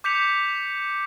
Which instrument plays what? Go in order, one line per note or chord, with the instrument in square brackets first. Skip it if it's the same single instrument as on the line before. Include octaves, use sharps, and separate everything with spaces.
[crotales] D6 G6 B6 C#7 F7